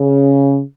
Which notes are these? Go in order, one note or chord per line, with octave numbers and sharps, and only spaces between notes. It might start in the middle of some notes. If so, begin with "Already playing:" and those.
Already playing: C#3